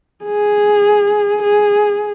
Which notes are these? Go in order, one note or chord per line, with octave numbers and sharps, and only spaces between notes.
G#4
G#4